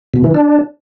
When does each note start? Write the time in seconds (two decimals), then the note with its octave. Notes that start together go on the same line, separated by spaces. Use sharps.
0.14 B2
0.24 E3
0.34 D4